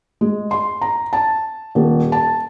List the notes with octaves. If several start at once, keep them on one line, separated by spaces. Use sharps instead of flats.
G#3
C6
A#5
A5
D#1
A5